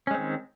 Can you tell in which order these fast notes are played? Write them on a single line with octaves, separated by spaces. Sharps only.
C#4 G#3 C4 D#3